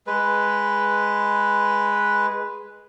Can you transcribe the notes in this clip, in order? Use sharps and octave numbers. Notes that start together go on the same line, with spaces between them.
G#3 B4